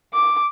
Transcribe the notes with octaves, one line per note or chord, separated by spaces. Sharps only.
D6